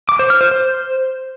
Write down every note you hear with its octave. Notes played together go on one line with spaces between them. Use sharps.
D6
C5
F6
C5
C5